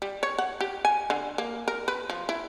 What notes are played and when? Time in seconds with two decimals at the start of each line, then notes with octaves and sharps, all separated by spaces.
0.02 G3
0.23 C#5
0.38 F#5
0.61 G4
0.85 G#5
1.10 D3
1.38 A#3
1.68 A#4
1.88 B4
2.10 F3
2.29 E4